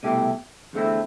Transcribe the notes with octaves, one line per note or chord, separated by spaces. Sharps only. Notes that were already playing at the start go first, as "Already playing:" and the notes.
C2 B2 A3 E4 G4
E2 D3 A3 C4 E4